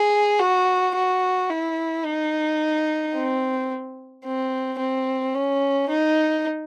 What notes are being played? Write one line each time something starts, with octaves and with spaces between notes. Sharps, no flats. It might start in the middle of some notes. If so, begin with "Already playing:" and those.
Already playing: G#4
F#4
F#4
E4
D#4
C4
C4
C4
C#4
D#4